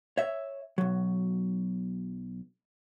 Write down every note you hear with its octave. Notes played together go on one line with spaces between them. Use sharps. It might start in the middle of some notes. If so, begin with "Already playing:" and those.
C#5 E5
B1 F#3